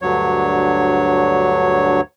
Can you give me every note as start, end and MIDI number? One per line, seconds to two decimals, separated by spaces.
0.02 2.01 38
0.02 2.01 43
0.02 2.01 54
0.02 2.01 73